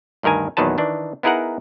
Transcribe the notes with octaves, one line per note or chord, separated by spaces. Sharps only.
D2 G2 D#3 A#4 G#5
E2 A#2 D#3 F#3 B4 A5
D#3 E3 D4
B3 D#4 E4 G#4 A#4 F#5